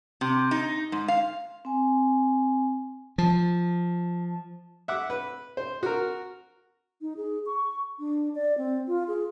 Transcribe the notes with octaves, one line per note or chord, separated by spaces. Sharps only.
C3
D#4
G#2
F5
C4 G#5
F3 A5
E5 F#5 D6
B4
C5
F#4 A#4
D#4
G#4
C#6
D4
D5
C4
F4
G#4